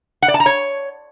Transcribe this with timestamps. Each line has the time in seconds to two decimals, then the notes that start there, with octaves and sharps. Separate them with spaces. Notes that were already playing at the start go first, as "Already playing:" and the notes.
0.22 F#5
0.28 D5
0.34 A5
0.40 A#5
0.46 C#5